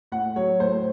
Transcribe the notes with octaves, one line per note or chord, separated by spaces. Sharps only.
A2 F#5
F#3 C#5
A2 C5